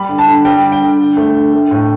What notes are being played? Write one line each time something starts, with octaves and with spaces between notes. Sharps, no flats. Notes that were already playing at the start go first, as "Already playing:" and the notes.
Already playing: G3 B5
D3
A5
D3
G3 G5
D3
G5
D3
D3
A3
D3
A3
A2